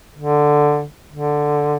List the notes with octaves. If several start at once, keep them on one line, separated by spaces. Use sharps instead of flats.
D3
D3